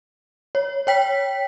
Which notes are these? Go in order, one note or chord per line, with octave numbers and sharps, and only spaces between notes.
C#5
C#5 G5 B6